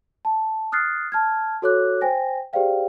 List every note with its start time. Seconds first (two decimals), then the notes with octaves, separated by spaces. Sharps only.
0.25 A5
0.72 D#6 F6 F#6 A6 C7
1.12 A5 F6 G#6
1.62 F#4 A4 C#5 D6 F#6
2.01 C5 G5 G#5 A#6
2.53 G4 G#4 C5 D5 F5 G5